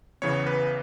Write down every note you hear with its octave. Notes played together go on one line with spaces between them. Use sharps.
E2 C#3 E3 B3 C#5
B4